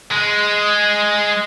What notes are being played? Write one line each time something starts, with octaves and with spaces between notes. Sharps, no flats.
G#3